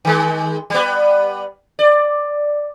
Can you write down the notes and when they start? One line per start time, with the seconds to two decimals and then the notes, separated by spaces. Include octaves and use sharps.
0.05 D#3 G#3
0.70 G3 B3
1.79 D5